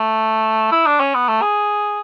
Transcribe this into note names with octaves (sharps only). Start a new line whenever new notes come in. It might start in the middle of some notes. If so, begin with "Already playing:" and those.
Already playing: A3
E4
D4
C#4
B3
A3
G#4